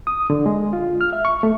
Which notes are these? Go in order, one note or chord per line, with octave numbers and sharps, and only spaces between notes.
D#6
D3
G#3
F4
F6
E5
C#6
A3